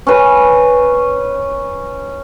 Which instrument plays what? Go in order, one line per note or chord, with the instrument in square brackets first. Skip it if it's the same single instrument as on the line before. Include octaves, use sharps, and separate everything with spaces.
[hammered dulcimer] C#4 B4